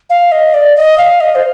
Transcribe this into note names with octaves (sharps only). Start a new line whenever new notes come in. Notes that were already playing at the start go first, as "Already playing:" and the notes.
F5
D#5
D5
D#5
F5
D#5
C5